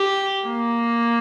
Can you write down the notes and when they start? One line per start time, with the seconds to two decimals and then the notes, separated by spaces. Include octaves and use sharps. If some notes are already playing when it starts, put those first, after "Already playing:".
Already playing: G4
0.47 A#3